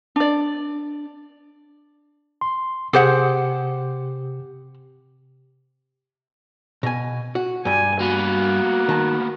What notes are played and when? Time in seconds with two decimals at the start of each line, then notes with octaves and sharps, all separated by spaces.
0.16 D4 D5
2.41 C6
2.93 C3 G4 G#4 C5 F#5 D6
6.83 B2 G#5
7.35 F#4
7.65 G2 G3 G#5
8.00 A#3 B3 F#4
8.89 D#3 A5